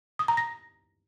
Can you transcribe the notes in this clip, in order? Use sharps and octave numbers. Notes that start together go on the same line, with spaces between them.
D#6
A#5
A#6